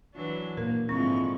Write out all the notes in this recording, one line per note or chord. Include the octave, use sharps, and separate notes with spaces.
E3 F#3 D4
A#2 A#3 A#4
G#2 D3 F3 G#3 C4 E4 C#6